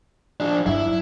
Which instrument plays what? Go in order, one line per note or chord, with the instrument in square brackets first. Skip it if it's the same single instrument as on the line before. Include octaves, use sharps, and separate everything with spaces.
[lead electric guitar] F3 D4
[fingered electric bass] G2 F#3 [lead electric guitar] E4